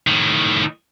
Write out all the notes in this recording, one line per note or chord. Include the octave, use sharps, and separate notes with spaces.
A2 D#3